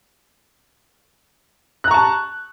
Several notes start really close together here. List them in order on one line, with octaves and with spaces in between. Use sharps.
F#6 A#5 C#6 A5